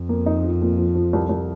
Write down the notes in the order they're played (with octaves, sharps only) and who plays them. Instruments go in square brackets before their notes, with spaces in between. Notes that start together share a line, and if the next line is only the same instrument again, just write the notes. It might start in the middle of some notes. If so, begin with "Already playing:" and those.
Already playing: [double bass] F2
[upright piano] A#3
D#4
F3
A#2
F3
F3
C2
C2